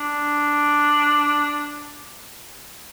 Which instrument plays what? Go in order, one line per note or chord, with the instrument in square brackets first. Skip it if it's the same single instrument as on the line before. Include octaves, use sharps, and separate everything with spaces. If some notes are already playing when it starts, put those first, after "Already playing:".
Already playing: [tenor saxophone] D4